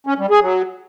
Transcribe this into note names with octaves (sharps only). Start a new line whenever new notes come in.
C#4
G3
G#4
F#3